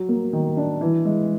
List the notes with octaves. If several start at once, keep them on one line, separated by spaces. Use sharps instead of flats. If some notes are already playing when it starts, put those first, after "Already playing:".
Already playing: F#3
A#3
D#3
D4
E3
G#3